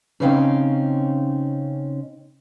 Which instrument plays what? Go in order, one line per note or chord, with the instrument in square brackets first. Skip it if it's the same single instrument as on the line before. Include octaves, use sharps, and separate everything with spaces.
[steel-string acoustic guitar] C#3 C4 C#4 D#4 F5 G5